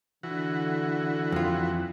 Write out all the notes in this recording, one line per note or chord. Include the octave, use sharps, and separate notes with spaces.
D3 E3 F#4
F2 F4